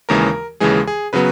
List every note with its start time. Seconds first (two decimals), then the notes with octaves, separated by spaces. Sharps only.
0.09 D#2 C#3 E3 G#3 A#4
0.60 D#2 C#3 E3 G#3 G#4
0.87 G#4
1.13 C#3 F#3 B3 B4